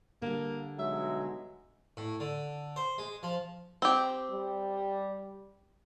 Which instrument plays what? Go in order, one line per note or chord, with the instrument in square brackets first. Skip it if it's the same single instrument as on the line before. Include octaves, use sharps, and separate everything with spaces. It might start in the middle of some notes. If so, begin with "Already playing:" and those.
[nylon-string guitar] D3 G3 [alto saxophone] A#3
[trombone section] B1 F#3 G#3 [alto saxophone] E5
[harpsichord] A2
D3
C5
G#3
F3
[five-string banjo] C4 G4
[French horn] G3